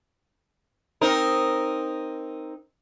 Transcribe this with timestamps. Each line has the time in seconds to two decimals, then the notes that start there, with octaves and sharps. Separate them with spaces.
1.01 C4 D#4 A#4